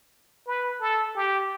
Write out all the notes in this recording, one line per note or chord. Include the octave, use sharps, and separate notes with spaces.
B4
A4
G4